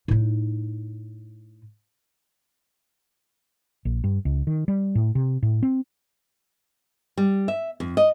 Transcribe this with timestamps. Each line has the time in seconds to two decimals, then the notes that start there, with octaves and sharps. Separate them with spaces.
0.08 A2 D#4
3.85 A#1
4.04 G2
4.25 C#2
4.47 D#3
4.68 G3
4.95 A2
5.15 C3
5.43 A2
5.63 C4
7.17 G3
7.48 E5
7.80 F2
7.97 D#5